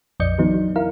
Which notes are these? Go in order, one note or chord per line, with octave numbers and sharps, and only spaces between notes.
A#1 F2 D5 D#5 G6 C#7
D3 E3 F#3 B3 D#4
F#3
E4 A#4 F5